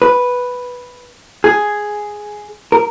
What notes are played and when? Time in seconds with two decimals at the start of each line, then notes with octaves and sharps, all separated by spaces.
0.02 B4
1.44 G#4
2.72 A#4